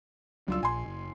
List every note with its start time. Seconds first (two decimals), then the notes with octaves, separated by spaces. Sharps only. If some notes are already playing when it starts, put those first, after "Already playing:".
0.48 C#2 F#3 G3 D4 F4 E6
0.63 A#1 G#5 C6
0.86 F#1